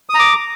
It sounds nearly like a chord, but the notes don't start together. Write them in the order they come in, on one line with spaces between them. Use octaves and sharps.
D#6 A#5 D6